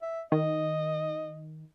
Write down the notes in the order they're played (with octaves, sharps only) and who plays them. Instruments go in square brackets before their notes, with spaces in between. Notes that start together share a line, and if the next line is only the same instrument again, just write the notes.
[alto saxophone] E5
[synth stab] D#3 [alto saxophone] D#5